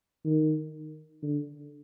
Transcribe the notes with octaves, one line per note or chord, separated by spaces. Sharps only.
D#3
D3